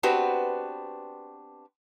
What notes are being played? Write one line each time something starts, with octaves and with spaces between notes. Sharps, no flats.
B3 C4 D4 F#4 G4 B4